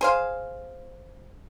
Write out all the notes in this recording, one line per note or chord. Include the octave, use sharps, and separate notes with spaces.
G#4 C5 F5